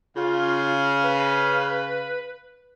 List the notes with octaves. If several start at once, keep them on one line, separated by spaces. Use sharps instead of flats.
C#3 F4 F5
B4